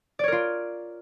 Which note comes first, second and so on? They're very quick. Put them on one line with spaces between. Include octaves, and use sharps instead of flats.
D5 C#5 A#4 F4